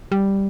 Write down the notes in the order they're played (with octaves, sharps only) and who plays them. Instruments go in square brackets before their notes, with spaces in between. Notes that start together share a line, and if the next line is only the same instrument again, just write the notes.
[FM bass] G3